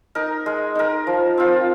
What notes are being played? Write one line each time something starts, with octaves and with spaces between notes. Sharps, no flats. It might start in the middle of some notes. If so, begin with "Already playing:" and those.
D#4 A#4
G#3
D#4 A#4
F3
C4 F4